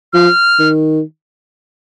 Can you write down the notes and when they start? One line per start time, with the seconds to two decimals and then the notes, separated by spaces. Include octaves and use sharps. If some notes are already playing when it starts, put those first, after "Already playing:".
0.13 F3 F6
0.59 D#3